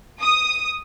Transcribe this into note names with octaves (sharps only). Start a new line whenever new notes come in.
D#6